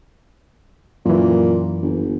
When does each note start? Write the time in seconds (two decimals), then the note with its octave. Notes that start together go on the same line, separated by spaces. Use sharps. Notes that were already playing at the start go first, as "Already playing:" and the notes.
1.06 F#2 A#2 E3
1.82 G1